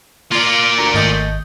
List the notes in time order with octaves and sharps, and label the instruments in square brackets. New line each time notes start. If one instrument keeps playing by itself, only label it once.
[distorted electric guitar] A#3 D5 [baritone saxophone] F4
[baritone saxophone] D2 [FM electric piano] A#5
[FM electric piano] G#1 D#5 G6 [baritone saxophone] A3